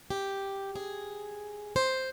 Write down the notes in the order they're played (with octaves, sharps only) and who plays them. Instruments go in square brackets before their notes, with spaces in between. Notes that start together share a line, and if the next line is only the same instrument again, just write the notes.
[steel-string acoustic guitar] G4
G#4
C5